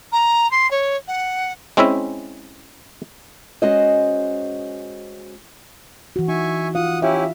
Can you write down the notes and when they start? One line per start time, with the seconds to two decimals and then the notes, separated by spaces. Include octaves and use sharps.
0.12 A#5
0.51 C6
0.70 C#5
1.07 F#5
1.77 G#3 C4 C#4 E4 E5
3.62 G#3 C#4 F#4 C5 D#5
6.16 E3 F#4
6.28 D#4 E5 G#5 C#6
6.75 F4 F5 F#5 D#6
7.02 C#4 E4 G4 E5